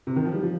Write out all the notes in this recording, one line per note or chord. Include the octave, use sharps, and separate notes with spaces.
C3
D#3
F3
G3
F3